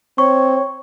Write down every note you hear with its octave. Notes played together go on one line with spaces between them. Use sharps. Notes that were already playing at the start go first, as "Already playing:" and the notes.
C4 C#5 C#6